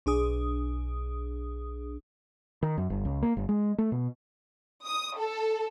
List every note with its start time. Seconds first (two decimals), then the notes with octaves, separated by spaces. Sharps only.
0.06 B1 D4 G#4 D#6
2.63 D#3
2.78 F#2
2.90 G1
3.05 C#2
3.22 A#3
3.37 G1
3.49 G#3
3.78 A3
3.92 B2
4.85 D#6
5.17 A4